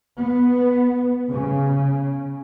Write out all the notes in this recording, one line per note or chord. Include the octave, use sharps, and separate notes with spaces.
B3
C#3